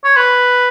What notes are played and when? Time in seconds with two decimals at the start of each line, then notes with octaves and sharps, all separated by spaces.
0.04 C#5
0.16 B4